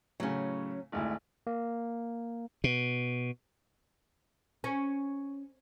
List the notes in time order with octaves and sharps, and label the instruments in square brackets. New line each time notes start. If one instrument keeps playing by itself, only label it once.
[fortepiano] A2 C#3 [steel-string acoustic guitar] F#3 C#4
[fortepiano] G#1 D2 E4
[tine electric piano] A#3
[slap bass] B2
[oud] C#4